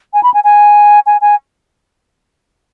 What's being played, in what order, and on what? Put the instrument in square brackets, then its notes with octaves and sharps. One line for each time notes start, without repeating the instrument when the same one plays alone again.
[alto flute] G#5
B5
G#5
G#5
G#5
G#5